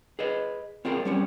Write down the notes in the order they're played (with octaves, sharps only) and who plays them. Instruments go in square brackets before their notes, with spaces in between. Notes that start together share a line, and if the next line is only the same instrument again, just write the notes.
[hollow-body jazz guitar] G#4 B4 D#5
C4 F4 G#4 A#4
G3 C4 C#4